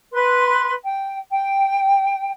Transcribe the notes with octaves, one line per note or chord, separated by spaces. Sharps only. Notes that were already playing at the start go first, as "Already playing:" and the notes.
B4 C6
G5
G5